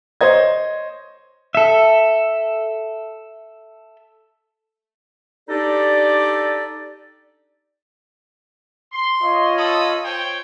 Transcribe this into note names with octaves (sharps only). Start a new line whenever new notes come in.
C5 C#5 D#5 G#6
A4 E5
D4 D#4 G4 A4 D5
C6
F4 C#5 D#5
A4 B5 D#6
C5 C#5 G5